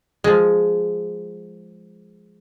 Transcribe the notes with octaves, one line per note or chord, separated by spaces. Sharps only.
F3 G#3